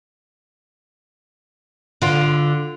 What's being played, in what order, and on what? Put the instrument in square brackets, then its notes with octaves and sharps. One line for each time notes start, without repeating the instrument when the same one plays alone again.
[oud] D3 F4